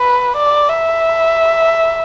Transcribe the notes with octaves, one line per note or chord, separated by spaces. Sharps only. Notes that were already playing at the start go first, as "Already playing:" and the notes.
Already playing: B4
D5
E5